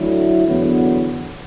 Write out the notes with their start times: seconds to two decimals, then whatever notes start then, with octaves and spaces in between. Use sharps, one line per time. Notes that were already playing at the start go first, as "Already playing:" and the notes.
Already playing: D3 F#3 A3 E4
0.46 E2 D3 F#3 B3